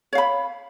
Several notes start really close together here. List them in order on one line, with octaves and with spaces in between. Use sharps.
C#5 F5 B5